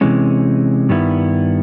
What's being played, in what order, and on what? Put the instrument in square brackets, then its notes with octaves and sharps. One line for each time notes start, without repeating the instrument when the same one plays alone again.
[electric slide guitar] C3 E3 G#3 C#4
G2 D#3 G3 B3 E4